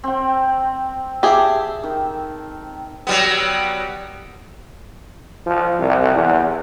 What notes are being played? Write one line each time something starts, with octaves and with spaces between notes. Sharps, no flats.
C4 G5
G4 G#4 E5 A5
D#3
F#3 G3 B3
F3
C2
E2